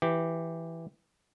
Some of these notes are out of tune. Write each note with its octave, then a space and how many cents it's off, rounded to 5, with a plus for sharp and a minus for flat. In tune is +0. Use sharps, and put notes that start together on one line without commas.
E3 +5 G4 +0